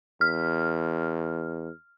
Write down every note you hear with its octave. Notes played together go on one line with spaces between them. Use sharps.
E2 F6